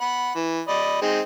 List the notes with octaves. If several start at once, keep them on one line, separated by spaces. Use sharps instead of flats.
F#5 B5
E3
D5 D#5 B5
G#3 C4 D#4